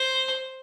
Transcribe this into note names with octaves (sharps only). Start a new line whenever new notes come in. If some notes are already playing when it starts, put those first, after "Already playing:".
Already playing: C5